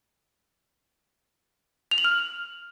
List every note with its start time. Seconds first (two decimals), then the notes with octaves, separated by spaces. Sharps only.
1.91 F7
1.98 F#7
2.04 F6